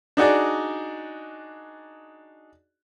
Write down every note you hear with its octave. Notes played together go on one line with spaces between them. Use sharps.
D4 D#4 F#4 G#4 D5